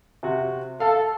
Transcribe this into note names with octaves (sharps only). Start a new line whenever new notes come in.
C3 F#4
A4 F5